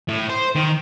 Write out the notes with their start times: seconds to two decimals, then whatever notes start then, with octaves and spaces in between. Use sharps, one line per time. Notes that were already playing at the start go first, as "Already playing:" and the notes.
0.08 A2
0.29 C5
0.55 D#3